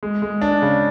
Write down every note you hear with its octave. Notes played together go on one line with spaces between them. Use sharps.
G#3
G#3
D4
C#3